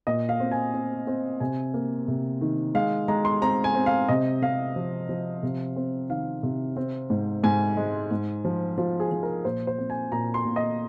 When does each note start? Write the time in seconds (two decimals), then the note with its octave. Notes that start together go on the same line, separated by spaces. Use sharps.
0.07 A#2 D#5
0.29 F5
0.40 C4
0.51 G#5
0.74 C4
1.07 C4
1.40 C3 G#5
1.74 A#3
2.08 C3
2.41 D#3
2.74 G#3 F5
3.08 G#3 A#5
3.25 C6
3.42 C4 A#5
3.64 G#5
3.75 C4
3.86 F5
4.09 C3 D#5
4.42 C3 F5
4.76 F3
5.09 F3
5.43 C3
5.76 C4
6.09 D#3 F5
6.43 C3
6.77 C4
7.10 G#2
7.43 G#2 G#5
7.77 G#3
8.11 G#2
8.45 F3
8.78 F3 F4
9.00 G#4
9.12 F3
9.23 A#4
9.45 A#2 C5
9.67 C5
9.78 C4
9.90 G#5
10.12 A#2 A#5
10.34 C6
10.45 A#2
10.56 D#5